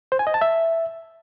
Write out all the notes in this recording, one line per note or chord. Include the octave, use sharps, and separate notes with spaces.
C5
G#5
D#5
A5
E5